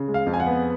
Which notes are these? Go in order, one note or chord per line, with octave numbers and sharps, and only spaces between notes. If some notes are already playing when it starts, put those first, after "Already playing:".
Already playing: C#3
G#3
F5
F2
G#5
F#5
B3